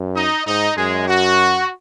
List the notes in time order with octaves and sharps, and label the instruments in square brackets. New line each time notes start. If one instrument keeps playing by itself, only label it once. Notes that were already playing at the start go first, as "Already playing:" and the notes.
Already playing: [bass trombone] F#2
[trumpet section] D#4 D#5
[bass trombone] G#2 [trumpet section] D#4 D#5
[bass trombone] F#2 [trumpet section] G#3 G#4
[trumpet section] F#4